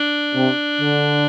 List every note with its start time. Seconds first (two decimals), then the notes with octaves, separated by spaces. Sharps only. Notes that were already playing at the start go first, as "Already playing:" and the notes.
Already playing: D4
0.35 C3
0.80 D3